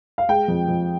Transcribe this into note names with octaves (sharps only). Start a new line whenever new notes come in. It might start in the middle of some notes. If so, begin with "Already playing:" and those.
F5
G#3 G5
F2
F2